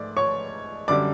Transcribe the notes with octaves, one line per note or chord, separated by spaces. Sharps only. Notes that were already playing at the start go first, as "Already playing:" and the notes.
Already playing: G#2 A3 D5 D6
C#5 C#6
F#2 D3 G3 D5 D6